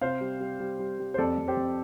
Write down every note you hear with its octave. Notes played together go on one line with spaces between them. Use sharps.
C3 C5 F5
G3
G3
G3
G3
G3
C5
F2 A4 D5
F2
G4 C5
F2